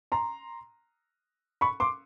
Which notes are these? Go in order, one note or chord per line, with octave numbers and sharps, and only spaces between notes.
A#5 C6
B5 C#6
C6 D6